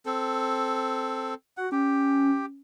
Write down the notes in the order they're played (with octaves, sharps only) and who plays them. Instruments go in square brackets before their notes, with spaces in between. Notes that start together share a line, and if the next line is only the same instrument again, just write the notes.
[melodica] C4 A4
[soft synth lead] F#4 [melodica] F#5
[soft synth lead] C#4 [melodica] G4